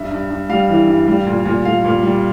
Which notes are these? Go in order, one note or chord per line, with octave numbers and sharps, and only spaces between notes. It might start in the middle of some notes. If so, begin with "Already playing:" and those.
Already playing: G2 E5
G2
G2
G3 F5
E3
G2
G3
A#2
A#2
A#2 F5
A#2
G3